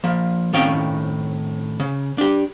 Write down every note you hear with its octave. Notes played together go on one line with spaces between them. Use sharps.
F3 A#3
A2 D#3 C4 C#4 F5 G5
C#3
D4 G4